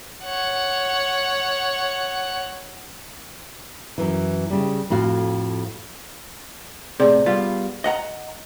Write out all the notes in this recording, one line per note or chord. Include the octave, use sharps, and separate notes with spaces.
C#5 F#5
F#2 E3
C#3 G3
F2 A2 F#4 F5
A2 C3 G#4 D5
G3 B3 F4
D#5 F#5 A#5